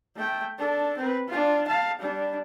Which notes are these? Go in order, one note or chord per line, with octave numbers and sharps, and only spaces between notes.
A3 G5
D4 A4
C4 B4
D4 F4
F5 A5
G3 D4